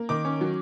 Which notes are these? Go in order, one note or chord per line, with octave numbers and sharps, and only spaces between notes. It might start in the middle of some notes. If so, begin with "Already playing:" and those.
Already playing: A#3
D#3 D6
C#4
F#3